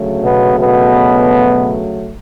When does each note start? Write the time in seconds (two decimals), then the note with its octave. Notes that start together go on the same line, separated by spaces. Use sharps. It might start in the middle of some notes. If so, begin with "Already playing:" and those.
Already playing: D2 C#3 F#3 A3
0.23 B2 B3
0.58 B2 B3